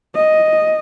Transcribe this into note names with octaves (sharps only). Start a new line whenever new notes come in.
D#5